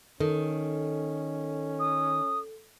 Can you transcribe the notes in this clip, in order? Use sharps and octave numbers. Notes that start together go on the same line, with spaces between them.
D#3 C#4 A4
D#6